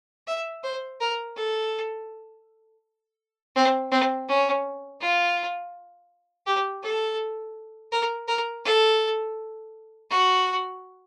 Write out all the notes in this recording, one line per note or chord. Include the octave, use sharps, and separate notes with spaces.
E5
C5
A#4
A4
C4
C4
C#4
F4
G4
A4
A#4
A#4
A4
F#4